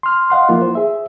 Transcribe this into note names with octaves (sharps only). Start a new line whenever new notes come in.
C6 F6
D#5 F5 F#5 C6
F3 A#3 E4 F4
C5
G#4 E5